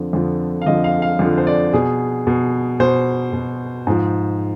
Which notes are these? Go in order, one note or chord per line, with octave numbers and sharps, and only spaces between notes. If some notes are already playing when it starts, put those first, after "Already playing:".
Already playing: F2 D3 F3
F2 D3 F3
F5
F2 D3 F3 D#5
F5
F5
F2 D3 F3
C5
D5
B2 G#4
B2
B2 C5
B2
G#2 F3